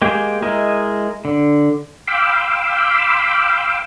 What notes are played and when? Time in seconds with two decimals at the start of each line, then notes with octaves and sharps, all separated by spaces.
0.02 G#3 A#3 G4 G#4 G5
0.42 G#3 E4 A#4 D#5
1.25 D3
2.07 F5 G5 B5 C6 D6 E6